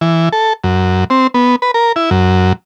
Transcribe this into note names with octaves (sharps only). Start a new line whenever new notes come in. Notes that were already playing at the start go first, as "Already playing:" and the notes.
E3
A4
F#2
C4
B3
B4
A#4
E4
F#2